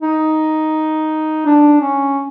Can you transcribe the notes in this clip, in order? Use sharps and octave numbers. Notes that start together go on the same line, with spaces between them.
D#4
D4
C#4